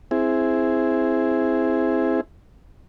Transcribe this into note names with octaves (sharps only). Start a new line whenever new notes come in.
C4 E4 G#4